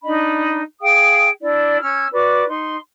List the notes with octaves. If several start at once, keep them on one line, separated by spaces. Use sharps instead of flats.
D4 D#4 D#5 B5
G#4 F5 G5 D#6
D4 E4 D5
C#4 E6 F6 G#6
F#4 B4 D5 D6
D#4 C6